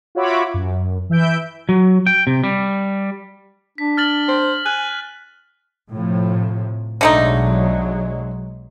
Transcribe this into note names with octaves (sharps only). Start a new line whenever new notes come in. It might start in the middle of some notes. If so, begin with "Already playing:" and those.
F4 F#4 C#5 E5 B5 D6
F#2
E3 E5 G6 D7
F#3
G5
C3
G3
D4 B6
F6 A6 F#7
C5
G#5 F#6
A2 C3 F3
B1 D3 F#3 G#3 A3 D#4